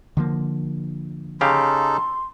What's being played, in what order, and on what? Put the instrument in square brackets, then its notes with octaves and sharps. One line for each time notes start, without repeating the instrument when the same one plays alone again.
[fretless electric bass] D3 F3 A#3
[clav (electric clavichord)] C#3 G4 F5 [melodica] D#4 A4 [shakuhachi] C6